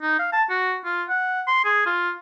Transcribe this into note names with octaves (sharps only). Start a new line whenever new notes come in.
D#4
F5
A5
F#4
F4
F#5
C6
G#4
F4